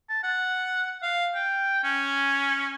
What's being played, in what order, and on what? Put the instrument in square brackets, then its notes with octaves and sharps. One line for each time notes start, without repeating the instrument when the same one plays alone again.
[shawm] A5
F#5
F5
G5
C#4